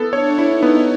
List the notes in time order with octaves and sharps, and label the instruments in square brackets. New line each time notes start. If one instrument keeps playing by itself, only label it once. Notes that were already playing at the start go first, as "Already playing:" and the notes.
Already playing: [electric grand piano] B3 E4 A4
[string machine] D4 [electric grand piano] C#5
[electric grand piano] E4
[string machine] D#4
[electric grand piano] B3